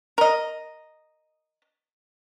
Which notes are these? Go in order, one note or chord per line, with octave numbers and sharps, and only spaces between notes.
A#4 D#5